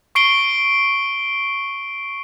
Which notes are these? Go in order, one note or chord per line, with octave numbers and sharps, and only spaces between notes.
C#6 C7 D7 G7